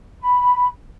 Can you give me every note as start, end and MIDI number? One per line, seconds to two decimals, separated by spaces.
0.21 0.67 83